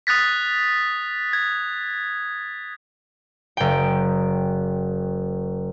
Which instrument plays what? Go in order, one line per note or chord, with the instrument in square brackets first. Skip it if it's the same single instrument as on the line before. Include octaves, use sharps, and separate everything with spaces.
[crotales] D#6 F#6 A6 B6
G#6
[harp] F#1 G5